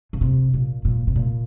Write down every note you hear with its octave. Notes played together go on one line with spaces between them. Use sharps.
C#3
C3
A#2
A#2
C3
A#2